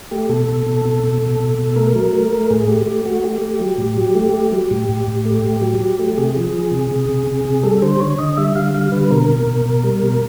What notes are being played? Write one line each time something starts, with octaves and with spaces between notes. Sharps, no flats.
A3 G4
B2 A4
B2
B2
B2
B2
B2
B2
B2
A3 A#4
F#3
A3
A3
A2 G#4
A3 G4
A3 G4
A3 F#4
A3 G4
A3
F#3
A2
F#3
A3
A3
F#3
A2
A2
A2
A3
A2
F#3
F#3
A3
C3 G#4
F3
F3
C3
C3
C3
C3
C3
G3 A4
D3 C5
D3 C#5
D3 D#5
G3 E5
D3 F5
G3 F5
D3 B4
B2 A#4
B2
B2
B2
G3
B2